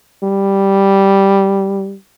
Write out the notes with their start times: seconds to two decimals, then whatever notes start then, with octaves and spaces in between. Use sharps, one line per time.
0.22 G3